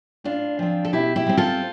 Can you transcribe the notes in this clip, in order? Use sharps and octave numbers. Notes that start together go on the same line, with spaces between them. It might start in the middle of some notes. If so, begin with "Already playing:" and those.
A2 D4 F4
F3 C4
A4
B2 E4 G4
E4 G4
G3 C4
F4 A4